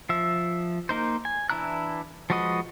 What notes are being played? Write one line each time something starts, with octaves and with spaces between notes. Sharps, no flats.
F3 E5
A#3 D#4 C5
G#5
E3 D4 E4 A#5 F#6
F3 G#3 F#4 B4 D#5